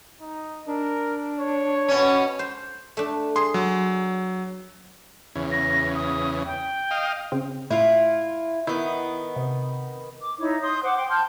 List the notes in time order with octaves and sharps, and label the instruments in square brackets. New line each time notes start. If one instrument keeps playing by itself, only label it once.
[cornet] D#4
[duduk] D4 [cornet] A#4
[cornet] C#5
[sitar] B2 C#4
[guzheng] C5
A3 D4
[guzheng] G#4 [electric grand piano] C6
[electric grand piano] F#3
[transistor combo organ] E2 C#3
[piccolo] A#6
D#6
G5
[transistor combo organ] D#5 F5
[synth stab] C#3 C4
[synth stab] A2 [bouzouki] E4 F4
[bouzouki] D#3 B3 [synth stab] E4
[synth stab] C3
[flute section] D6
D#4 E4 C#5
C6 D#6 G6
C5 F#5 D6
G5 C6
A5 C6 F6 G6